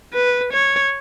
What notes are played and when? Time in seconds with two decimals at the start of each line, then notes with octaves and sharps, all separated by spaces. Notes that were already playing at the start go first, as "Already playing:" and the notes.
0.14 B4
0.53 C#5